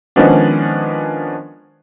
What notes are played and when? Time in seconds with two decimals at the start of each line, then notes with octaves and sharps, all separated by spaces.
0.16 D#3 F3 G#3 B3 C#4 D4